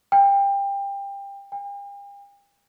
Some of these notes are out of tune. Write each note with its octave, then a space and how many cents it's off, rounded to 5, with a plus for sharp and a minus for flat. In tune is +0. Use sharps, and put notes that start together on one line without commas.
G5 +25
G5 +45